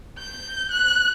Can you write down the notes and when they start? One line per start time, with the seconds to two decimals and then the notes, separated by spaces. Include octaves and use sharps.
0.19 G6
0.71 F#6